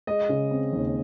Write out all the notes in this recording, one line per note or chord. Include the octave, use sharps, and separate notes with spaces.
G#3 D#5
C#3
C4
D#2